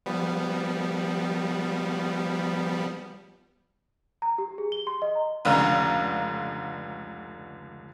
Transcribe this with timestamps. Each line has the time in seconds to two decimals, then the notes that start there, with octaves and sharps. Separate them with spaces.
0.06 F3 G3 B3
4.22 A#5
4.38 G4
4.58 G#4
4.72 G7
4.87 C6
5.02 D#5
5.15 A#5
5.45 F1 C#2 D3 A#5